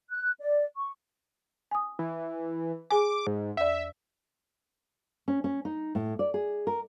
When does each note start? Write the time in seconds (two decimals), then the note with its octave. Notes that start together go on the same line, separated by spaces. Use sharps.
0.10 F#6
0.40 D5
0.77 C#6
1.71 G#5 D#6
1.99 E3
2.90 G#4 G#5 D6
3.27 G#2
3.57 E2 D5 E5
5.28 C#4
5.44 C#4
5.65 D#4
5.95 A2
6.19 D5
6.34 G#4
6.67 A#4